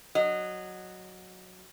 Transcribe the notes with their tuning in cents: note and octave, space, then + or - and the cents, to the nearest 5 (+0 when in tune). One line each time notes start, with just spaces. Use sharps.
F#3 +0 D#5 -15